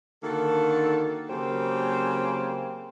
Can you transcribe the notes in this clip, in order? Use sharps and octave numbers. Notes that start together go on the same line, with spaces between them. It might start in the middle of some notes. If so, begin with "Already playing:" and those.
D3 D#3 A#3 F#4 A4
C#3 F#3 A#3 C4 G4 C5